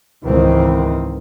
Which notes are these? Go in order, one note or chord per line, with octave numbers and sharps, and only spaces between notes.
C#2 G#2 D#3 E3 C4